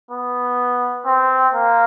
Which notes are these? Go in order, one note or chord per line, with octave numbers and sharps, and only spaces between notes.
B3
C4
A#3